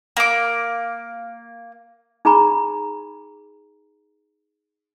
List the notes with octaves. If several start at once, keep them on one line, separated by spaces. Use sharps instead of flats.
A#3 D6
D#4 G#4 G#5 A#5 B5 C#6